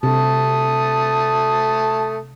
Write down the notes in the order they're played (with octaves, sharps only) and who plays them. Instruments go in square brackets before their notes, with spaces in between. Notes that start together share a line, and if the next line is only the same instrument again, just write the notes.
[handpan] C3 [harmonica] A3 A5 D#6